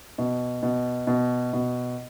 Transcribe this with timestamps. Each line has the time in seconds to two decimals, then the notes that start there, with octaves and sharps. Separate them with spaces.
0.18 B2
0.63 B2
1.07 B2
1.53 B2